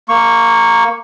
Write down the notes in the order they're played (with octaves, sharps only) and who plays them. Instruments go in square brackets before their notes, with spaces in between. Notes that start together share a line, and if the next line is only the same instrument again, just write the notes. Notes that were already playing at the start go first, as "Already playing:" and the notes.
[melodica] A#3 C#6